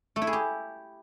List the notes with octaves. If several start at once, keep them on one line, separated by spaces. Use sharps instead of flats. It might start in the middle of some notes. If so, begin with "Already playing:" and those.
A3
E4
G#4
G4